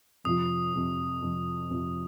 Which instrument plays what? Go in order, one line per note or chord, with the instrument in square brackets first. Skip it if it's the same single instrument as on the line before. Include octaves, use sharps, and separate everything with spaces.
[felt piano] F2 C3 F3 [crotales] D#6
[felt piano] F2 C3 F3
F2 C3 F3
F2 C3 F3